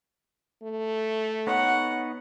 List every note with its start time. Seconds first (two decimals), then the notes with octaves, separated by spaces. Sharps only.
0.63 A3
1.47 B3 D#4 C#5 F#5